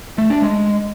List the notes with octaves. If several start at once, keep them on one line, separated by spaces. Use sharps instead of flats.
A3
D4
G#3